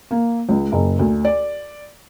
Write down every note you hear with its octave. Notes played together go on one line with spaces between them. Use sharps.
A#3
C#2
F#1
D2
D5